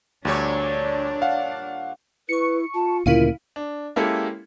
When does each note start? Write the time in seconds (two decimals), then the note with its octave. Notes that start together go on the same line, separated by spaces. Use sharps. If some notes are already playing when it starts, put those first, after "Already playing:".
0.25 D2 A#2 G3 D4 C#5
1.22 F5 F#5
2.29 E4 B4 C#6 C#7
2.74 F4 A5
3.06 D2 A#2 C#3 E4 F4 A#4 F5 D#7
3.56 D4
3.96 G#3 A#3 C#4 E4 G4 A4